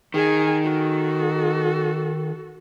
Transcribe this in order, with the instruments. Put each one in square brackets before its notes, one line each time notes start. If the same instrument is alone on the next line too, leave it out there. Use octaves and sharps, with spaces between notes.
[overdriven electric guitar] D#3 [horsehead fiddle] G#4 G#5
[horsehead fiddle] F#4 A4